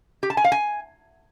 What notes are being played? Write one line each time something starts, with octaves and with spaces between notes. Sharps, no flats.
G4
A5
G#5
F5
G#5